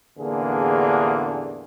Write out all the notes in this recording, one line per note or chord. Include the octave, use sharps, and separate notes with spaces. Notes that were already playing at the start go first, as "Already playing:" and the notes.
A1 E2 D3 A#3 D4 G#4